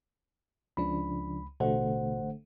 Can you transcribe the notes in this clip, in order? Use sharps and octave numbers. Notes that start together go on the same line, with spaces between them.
C#2 C#3 F3 D4 B5
A1 B2 D3 A3 C5 F#5